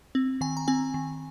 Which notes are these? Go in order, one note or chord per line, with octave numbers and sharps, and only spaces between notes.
C4
D#3 G#5
A#5
C4 G#5
D#3